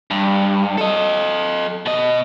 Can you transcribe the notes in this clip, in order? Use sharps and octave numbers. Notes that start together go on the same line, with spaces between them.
G2
A4 D#5
B2 D#5